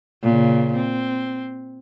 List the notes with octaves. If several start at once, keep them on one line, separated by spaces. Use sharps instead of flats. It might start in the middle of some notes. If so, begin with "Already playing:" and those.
A#2 C#3
C4